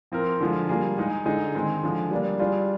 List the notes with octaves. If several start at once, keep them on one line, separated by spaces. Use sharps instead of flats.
F3 C4 F4 A#4
D3 F3 G#3
G3 A#3 F4 G#4
G#3 D#4 G#4
D3 G#3 D#4 G#4
D#3 G#3 C4
D3 F3 G#3
G3 A#3 D4
G3 D4 F4 G#4